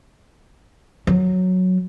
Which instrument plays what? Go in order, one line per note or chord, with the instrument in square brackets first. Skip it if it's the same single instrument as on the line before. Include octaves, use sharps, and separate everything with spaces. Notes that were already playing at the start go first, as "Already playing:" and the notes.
[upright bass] F#3